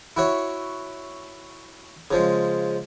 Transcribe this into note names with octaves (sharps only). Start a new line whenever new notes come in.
E4 F#4 C#5
C#3 F3 G#3